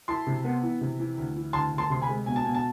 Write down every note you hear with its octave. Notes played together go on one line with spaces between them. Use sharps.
E4 A5 C6
C3
B3
E3
C3
E3
D2
E3
D2 A5 C6
D2
A5 C6
C3 C6
G#5 B5
G#3
B2 G#5
A5
B2 G#5
A5